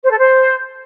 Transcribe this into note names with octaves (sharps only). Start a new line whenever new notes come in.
C5
A4
C5